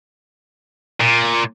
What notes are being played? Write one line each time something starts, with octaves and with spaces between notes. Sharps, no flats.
A#2